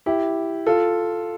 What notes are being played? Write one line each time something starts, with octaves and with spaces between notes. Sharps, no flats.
E4 G4
F4 A4